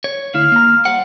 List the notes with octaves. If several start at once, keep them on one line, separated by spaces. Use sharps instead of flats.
C#5
D2 E4 F5
A#3 A#5
G3 C5 F#5